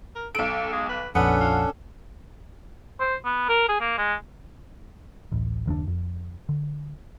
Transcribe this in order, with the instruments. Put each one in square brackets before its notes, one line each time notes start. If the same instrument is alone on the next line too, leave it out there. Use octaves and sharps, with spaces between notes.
[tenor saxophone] A#4
[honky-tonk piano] B1 D7 [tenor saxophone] A4
[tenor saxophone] G#3
B4
[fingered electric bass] A#1 F2 [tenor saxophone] B3 [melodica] C#4 D4 A4 [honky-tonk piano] F#5
[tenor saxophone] F4
[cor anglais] C5
B3
A#4
G#4
A#3
G#3
[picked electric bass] D1 A1
F#1 D#2 C4 D4
F2
D3